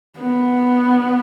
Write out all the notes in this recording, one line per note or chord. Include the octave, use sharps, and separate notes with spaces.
B3